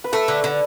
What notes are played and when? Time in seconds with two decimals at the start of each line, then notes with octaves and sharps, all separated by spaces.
0.04 B4
0.12 A3 A4
0.28 D3
0.44 D3